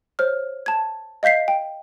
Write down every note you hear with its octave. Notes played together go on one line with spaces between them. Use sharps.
C5 C#5 F6
A5 G#6
D#5 F5 G6 B6 C7
G5